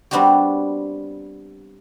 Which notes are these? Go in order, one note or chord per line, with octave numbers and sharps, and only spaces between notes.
G3 B3 C4 D4 F#4 G4